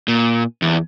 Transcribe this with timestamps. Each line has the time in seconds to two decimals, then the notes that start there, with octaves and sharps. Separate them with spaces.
0.08 A#2
0.62 E2